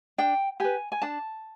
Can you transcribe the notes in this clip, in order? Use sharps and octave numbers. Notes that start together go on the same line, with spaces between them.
D4 G5
G4 B4 G#5
G#5
D4 A5